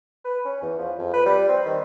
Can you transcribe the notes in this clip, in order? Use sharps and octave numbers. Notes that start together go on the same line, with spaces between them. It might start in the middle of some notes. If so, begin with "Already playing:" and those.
B4
C#4
E2
F3
F2
B4
G3
C4
D#3